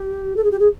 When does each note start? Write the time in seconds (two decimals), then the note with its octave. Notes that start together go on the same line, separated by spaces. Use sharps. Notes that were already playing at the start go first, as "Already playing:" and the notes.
Already playing: G4
0.36 A4
0.44 G#4
0.51 G4
0.59 G#4